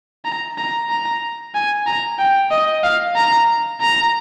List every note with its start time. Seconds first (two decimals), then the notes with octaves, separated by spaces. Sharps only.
0.25 A#5
0.58 A#5
0.90 A#5
1.55 G#5
1.87 A#5
2.19 G5
2.51 D#5
2.83 F5
3.16 A#5
3.81 A#5